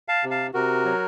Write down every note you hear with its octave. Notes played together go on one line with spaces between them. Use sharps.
F5 A5
C3
F5 A5
C3 F#4 A#4
F#3